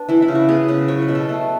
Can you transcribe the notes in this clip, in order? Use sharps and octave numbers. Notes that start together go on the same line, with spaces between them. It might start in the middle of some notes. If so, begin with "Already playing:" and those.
Already playing: B3 D4
E3 E4
E4
C#3
F#4
B3 G#4
C#3 B4
F#3 C#5
B4
B2
A4
A3 A4